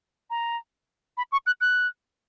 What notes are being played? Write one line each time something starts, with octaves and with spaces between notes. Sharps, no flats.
A#5
B5
C#6
F#6
F#6